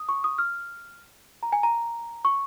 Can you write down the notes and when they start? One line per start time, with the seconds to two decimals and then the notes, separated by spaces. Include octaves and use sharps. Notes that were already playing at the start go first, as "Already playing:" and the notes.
Already playing: D#6
0.09 C#6
0.24 D#6
0.38 F6
1.43 A#5
1.52 G#5
1.63 A#5
2.25 C#6